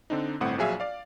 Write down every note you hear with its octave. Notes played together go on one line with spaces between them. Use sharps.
D3 C4 D4 D#4
G1 A2 C4 F#5
A#1 F#3 G#4 E5 F5 G#5
D5 F5